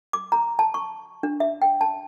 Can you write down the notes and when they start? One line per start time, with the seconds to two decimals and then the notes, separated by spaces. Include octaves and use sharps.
0.13 D6
0.32 A#5
0.59 A5
0.74 C#6
1.23 D4
1.40 E5
1.62 G5
1.81 A5